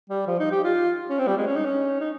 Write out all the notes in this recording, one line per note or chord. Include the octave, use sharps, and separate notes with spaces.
G3
F3
D#4
G4
F4
C#4
C4
G3
G#3
C#4
D#4
C#4
D#4